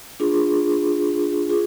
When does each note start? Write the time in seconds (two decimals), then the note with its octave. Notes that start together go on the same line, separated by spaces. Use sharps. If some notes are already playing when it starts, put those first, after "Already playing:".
0.20 D4 F4 G#4
1.49 F4 G#4